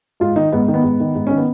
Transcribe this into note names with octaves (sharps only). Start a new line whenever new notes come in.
G#2 F4
D#3 D#4
G#2 B3
D#3
B3
G#2
D#3
G#2
D#3 C#4
B3